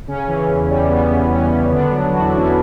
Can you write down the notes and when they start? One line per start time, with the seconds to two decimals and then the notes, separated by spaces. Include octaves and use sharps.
0.08 C#3 C#4
0.28 E3
0.48 E2
0.69 G3
0.89 C#3 B3
1.10 E3
1.30 E2 C#4
1.51 G3
1.71 D3 B3 D4
1.91 F#3
2.11 E2 F#4
2.20 E4
2.28 D4
2.32 E2 C#4 E4